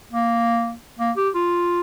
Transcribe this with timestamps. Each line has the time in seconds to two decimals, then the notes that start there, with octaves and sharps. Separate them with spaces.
0.12 A#3
0.99 A#3
1.17 G4
1.35 F4